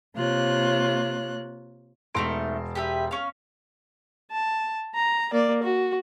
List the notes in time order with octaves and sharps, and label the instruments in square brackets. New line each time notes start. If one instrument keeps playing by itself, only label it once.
[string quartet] C3 A#3 F4 C#5 F#6
[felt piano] E1 C6 D7 [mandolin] A3 D#4 A#4
[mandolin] G4 B4 E5
C#4 F5
[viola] A5
A#5
A#3 D5
F#4